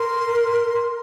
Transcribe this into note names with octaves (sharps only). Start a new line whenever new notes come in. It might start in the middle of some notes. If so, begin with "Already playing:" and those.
Already playing: A#4 C6